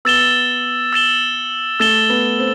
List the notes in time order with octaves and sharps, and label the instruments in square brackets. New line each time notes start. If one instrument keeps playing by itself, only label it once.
[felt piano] B3 [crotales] E6 A6 E7 G7
[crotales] E6 A6 E7 G7
[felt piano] A3 [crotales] E6 A6 E7 G7
[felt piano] B3
C4